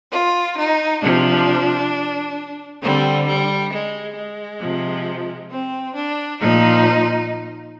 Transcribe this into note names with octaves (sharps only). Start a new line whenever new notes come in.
F4
D#4
C3 F3 D4
D3 G3 C4
G3
G#3
G#3
C3 F3
C4
D4
A#2 F3 D#4